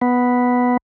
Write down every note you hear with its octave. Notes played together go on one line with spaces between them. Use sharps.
B3